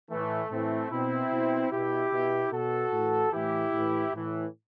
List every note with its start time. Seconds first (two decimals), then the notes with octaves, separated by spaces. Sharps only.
0.10 A2 E3 A3
0.51 A2 E3 A3 C4
0.91 B2 C4 E4
1.31 B2
1.72 B2 E4 G4
2.12 B2
2.52 B2 F#4 A4
2.92 A2 E3
3.32 A2 E3 E4 G4
3.73 A2 E3
4.13 A2 E3